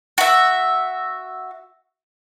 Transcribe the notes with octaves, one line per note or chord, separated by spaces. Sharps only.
F#4 E5